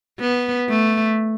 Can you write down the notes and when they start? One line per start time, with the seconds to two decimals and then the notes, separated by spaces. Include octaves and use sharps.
0.20 B3
0.69 A3